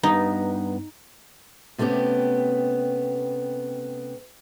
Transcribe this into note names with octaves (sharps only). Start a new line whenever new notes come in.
G2 B3 D#4
C3 A3 B3 C#4 G4